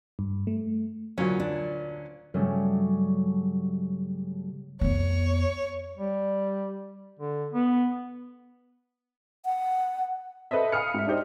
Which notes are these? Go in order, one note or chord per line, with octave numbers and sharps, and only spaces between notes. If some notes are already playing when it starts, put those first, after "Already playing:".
G2
A3
D2 A#2 F#3 C#4
D4
G2 C#3 F#3 G3 A3 C#4
F2 B3 C#5
G3
D3
B3
F#5
A4 B4 C5 D#5 E5
F5 G#5 B5 D#6 F6 C#7
G#2 E5
D4 D#4 G4 C5 D#5